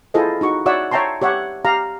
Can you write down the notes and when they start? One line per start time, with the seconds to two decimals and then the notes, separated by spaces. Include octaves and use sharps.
0.14 E4 F4 G#4 A4 C5 D#5
0.41 D#4 F#4 C#6
0.66 F#4 C#5 D5 E5 F#5 E6
0.91 C#5 E5 G5 A5 A#5 C6
1.22 G4 C#5 E5 F#5
1.64 G4 F5 A#5